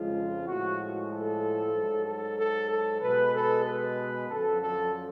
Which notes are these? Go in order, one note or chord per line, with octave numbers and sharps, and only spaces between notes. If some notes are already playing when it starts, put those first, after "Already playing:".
Already playing: F2 C#3 F3 G#3 F4
A2 F3 G#3 F#4
A4
G#2 F#3
A4
A4
A4
B2 G#3 B4
A4
B4
F#2 D3 F3 A4
A4